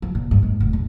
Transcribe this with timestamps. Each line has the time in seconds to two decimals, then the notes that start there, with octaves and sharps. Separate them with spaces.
0.02 F3
0.15 A#2
0.31 G2
0.43 G#2
0.60 F1
0.73 A#1